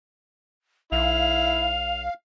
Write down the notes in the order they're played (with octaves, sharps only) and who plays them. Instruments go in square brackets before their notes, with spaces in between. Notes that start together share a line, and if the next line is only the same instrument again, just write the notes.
[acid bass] B1 [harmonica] E4 [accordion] F5 [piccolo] F7